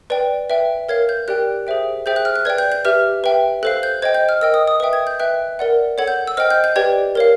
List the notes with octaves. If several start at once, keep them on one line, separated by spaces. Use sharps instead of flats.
B4 D5 G5
B4 E5 G5
A#4 C#5 F5 G#6
G6
G4 A#4 D5 G5 F#6
G#4 C5 E5 G5
G#4 C5 E5 G5 G6
F#6
F6
F#6
B4 D5 G5 G#6
G6
G6
G4 B4 E5 F6
B4 E5 G5
A4 C5 F5 F#6
G6
C5 D#5 G5 G#6
G6
F6
A#4 D#5 G5 E6
D#6
D#6
B4 E5 G5 D#6
G#6
G6
B4 E5 G5 F#6
A#4 D5 F#5
A4 C#5 F#5 G#6
G6
E6
C5 D#5 G5 F6
G6
G6
G4 B4 D5 G5 G#6
A#4 C#5 F5